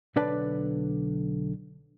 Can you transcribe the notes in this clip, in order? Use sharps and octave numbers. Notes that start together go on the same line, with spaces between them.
B1 D3 D4 B4 D5 A5